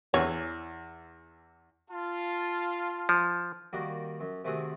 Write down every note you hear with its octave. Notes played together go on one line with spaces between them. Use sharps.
E2 E3 C#5
F4 A5
F3
D#3 G3 A#3 F#4
F#2
C3 D#3 A3 F#4 G#4